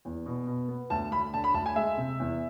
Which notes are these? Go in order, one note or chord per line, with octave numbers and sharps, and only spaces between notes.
E2
B2
B2
B3
D2 A5
D2 B5
D3 A5
B5
D2 A5
G#5
G#3 E5
C3
E2